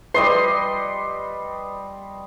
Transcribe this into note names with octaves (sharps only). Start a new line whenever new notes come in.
G3 B4 D#5 C6